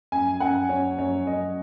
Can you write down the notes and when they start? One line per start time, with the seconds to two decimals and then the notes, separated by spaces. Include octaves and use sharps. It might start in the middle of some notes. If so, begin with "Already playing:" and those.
0.12 F#2 G#5
0.40 F#2 F#5
0.69 F#2 C#5
0.98 F#2 C#5
1.27 F#2 D#5